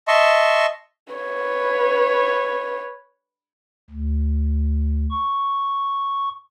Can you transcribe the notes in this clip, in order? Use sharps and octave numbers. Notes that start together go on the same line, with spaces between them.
D#5 E5 A5 C6 C#6
B4 C#5
D2
C#6